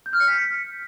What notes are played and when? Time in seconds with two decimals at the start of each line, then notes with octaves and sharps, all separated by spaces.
0.06 G6
0.13 F6
0.20 C#7
0.27 B6